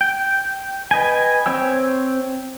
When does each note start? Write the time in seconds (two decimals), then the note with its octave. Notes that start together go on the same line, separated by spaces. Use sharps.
0.01 G5
0.91 B4 D#5 G5 G#5
1.46 C4 C#5 G5 E6